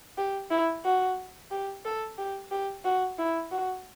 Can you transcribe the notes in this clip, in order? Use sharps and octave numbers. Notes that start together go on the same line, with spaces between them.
G4
E4
F#4
G4
A4
G4
G4
F#4
E4
F#4